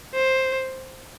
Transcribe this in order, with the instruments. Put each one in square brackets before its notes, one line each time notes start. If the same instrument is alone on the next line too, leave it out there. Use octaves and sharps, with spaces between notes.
[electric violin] C5